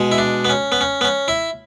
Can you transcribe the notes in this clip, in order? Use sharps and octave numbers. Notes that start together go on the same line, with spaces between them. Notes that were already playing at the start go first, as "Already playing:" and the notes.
Already playing: B2 G#3
E4
D4
B3
C#4
B3
C#4
B3
C#4
E4